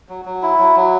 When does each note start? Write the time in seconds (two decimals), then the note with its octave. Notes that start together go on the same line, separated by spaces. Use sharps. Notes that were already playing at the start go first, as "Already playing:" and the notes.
0.09 F#3
0.25 F#3
0.42 E4
0.59 F#3
0.76 F#3